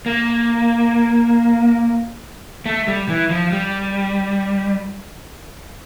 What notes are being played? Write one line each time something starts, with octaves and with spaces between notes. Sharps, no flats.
A#3
A3
G3
E3
F3
G3